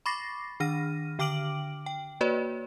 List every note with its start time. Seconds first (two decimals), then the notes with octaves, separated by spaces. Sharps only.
0.06 B5 C#6 D6 A6 A#6 C7
0.60 D#3 D4 F6 A#6 D#7
1.19 D3 G5 D6 F6 D7 F#7
1.86 G5
2.21 A#3 F#4 B4 C#5 D5